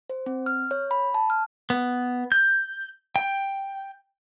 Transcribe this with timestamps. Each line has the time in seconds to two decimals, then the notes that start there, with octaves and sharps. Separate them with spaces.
0.10 C5
0.26 C4
0.46 F6
0.71 C#5
0.91 B5
1.14 A5
1.30 F6
1.70 B3
2.32 G6
3.16 G5